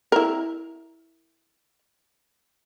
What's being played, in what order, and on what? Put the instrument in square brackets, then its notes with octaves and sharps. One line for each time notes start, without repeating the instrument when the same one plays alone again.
[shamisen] E4 A#4